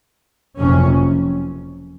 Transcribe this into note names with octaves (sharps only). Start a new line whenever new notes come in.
F#1 F2 C3 C#4